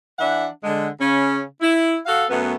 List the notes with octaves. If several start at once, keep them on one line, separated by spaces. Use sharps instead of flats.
E3 D4 E5 F#5
D3 G#3
C#3 C#4
E4
F#4 A4 F5
F#2 A3 B3